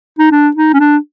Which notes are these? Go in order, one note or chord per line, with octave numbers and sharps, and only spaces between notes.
D#4
D4
D#4
C#4
D4